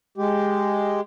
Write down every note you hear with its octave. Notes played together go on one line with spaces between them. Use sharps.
G#3 G4